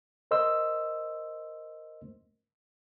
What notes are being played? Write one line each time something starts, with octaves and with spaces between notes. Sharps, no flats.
A#4 C5 D#5 C6 E6